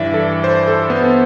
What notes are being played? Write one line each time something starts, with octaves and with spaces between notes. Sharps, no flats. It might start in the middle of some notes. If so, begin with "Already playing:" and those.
Already playing: G2 E3 D5 E5
A4
C5
A4
B3